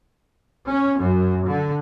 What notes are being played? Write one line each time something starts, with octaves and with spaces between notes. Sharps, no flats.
C#4
F#2
D3